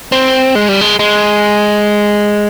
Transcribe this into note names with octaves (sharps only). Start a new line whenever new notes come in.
C4
G#3
G3
G#3
G#3